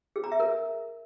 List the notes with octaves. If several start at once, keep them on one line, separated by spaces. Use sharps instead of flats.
G#4
A#5
E5
A#4